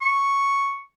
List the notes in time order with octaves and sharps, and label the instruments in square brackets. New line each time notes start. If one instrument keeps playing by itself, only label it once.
[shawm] C#6